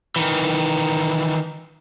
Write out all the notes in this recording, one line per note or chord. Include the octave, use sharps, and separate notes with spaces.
D#3 E3